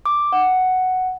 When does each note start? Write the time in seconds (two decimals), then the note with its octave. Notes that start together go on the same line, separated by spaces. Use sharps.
0.06 D6
0.32 F#5